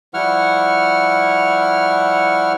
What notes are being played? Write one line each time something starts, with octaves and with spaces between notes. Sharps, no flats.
F3 G3 E4 F#5 C#6 F6